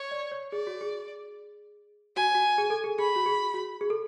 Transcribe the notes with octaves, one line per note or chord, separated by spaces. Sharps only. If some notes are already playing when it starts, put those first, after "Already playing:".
Already playing: C#5
D5
C#5
G#4 D5
F#4
G#4
F#4 G#5
F#4
G#4
A4
G#4
G#4 B5
F#4
G#4
F#4
G#4
A4